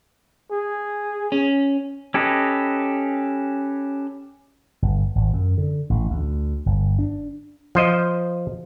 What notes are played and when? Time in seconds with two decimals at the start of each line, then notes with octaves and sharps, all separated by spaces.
0.52 G#4
1.32 C#4
2.14 C#4 G4 A4 B4 D#5
4.82 G1
5.15 G#1
5.33 F#2
5.58 D3
5.90 A1
6.10 D2
6.66 G1
6.99 D4
7.75 F3 C5 D#5